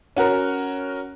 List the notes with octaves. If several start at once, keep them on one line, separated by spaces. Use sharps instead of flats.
C#4 F#4 A#4